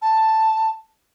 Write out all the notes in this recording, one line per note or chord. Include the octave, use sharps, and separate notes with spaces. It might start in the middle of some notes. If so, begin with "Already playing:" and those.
A5